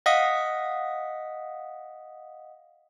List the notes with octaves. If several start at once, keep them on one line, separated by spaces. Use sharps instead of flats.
D#5 F5 F#5 D#6 B6